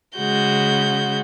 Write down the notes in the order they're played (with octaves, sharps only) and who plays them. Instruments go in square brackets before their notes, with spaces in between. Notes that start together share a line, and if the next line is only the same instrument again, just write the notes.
[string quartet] C#3 G#3 F#4 G6